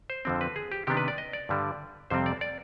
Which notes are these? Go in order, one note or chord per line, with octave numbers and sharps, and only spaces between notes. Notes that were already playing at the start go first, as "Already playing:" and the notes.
C5
F2 D3 F3 C4
B4
G#4
G4
C3 D#3 B3 D4 G4
B4
D5
D#5
D5
G2 D3 G3
F2 C3 G3 C4 C5
D5
D5